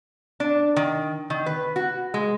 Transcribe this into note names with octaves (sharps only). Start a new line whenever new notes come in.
D4
D#3
D#3
B4
F#4
G#3